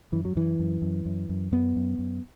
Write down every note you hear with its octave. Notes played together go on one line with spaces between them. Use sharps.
F#2 E3
F#3
F#2 E3
F#2
F#2
F#2
F#2
F#2 B3
F#2
F#2